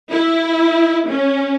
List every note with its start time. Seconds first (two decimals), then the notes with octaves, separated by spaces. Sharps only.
0.10 E4
1.08 C#4